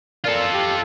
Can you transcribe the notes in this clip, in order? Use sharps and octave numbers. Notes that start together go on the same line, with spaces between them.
A#2 F4 A4
G4